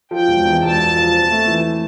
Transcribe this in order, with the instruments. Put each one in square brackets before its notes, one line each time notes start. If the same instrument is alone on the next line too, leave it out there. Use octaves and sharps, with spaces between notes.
[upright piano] F3 [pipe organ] G5
[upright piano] E1
E2
[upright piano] E1 [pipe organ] A5
[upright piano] F3
F3
C4
A3
E3